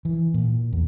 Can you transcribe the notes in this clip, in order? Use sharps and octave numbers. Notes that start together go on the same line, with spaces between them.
E3
A#2
E2